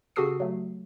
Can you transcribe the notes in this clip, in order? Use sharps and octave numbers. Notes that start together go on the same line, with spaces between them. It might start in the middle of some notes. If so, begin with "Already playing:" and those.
C#3 F#4 G4 A4 D#6 C7
F#3 A3